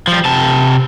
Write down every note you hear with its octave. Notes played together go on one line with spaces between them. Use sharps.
F3 G3
C3 A5